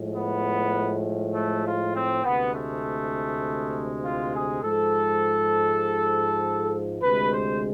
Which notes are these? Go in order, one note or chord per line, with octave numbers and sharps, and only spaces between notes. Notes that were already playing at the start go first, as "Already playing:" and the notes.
Already playing: A2 F3 G#3
B3
A3
F4
C4
D2 C3 G#3 B3
A3
F4
G#4
G#2 F3 G#3 A4
D2 C3 G#3 B4
C5